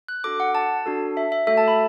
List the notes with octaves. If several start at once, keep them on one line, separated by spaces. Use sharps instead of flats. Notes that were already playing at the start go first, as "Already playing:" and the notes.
F#6
D4 F#4 A4 D6
F#5
A5
D4 F#4 A4
E5
E5
A3 F#4 A4 E5
A5
B5